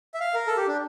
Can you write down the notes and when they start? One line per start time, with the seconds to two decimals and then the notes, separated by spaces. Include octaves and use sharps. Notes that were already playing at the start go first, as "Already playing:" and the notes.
0.14 E5
0.20 F5
0.34 A#4
0.47 A4
0.57 G4
0.67 D4